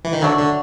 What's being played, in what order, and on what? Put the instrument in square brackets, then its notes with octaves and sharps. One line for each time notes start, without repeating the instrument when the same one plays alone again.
[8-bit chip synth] E3
D#3
[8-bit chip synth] D3 [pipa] F#3 A3 D4 F#4
[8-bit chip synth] D3